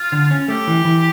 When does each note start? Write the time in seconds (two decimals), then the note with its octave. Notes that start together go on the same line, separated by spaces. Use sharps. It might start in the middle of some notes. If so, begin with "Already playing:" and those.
Already playing: F4
0.12 D3
0.31 C#4
0.48 A3 G4
0.67 E3
0.85 E3